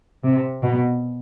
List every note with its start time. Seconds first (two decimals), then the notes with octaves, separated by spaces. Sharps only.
0.24 C3
0.63 B2